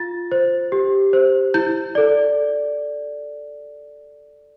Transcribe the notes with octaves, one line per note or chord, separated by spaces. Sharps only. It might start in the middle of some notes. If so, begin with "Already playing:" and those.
Already playing: F4 A6
C5
G4
C5
E4 G6
A4 D5